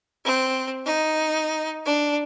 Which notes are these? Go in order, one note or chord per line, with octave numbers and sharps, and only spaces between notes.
C4
D#4
D4